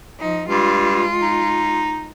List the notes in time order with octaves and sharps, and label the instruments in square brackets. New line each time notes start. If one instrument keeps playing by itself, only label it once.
[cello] F3 D#4
[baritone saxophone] G2 [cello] G#3 F4
[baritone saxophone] D#4